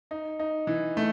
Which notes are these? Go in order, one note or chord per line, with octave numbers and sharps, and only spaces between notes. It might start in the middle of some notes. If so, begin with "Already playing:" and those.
D#4
D#4
E3
A3